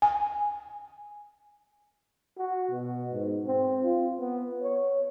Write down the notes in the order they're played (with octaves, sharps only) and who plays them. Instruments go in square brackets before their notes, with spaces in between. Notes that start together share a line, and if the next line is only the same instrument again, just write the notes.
[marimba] G#5
[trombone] F#4
B2
G#2
C4
F4
B3
C#5